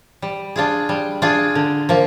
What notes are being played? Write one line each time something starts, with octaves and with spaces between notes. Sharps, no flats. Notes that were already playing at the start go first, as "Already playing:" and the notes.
G3
D4 F4 G#4
G3
D4 F4 G#4
D3
F3 A#3